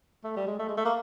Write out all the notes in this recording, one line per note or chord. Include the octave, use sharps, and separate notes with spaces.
A3
G3
G#3
A3
G#3
A3
A#3